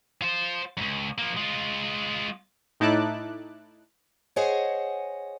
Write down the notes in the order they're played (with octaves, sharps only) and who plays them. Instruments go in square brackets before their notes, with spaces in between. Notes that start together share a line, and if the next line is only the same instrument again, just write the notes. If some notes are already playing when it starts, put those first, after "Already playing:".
[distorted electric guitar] F4 C5
C#2 F#2
F3 A#3
G#3 F4
[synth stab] A2 D#4 E4 A5 D6 F#6
[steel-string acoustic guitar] G#4 C5 C#5 D#5 F#5 G#5